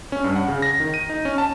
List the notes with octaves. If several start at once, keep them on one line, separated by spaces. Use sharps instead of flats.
C#4
G2
F#5
C#3
A#6
D#3
D#7
D#4
C#4
A5